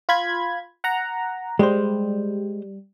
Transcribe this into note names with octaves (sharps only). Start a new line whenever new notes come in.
F4 B5 G#6
F#5 A#5
G3 G#3 C5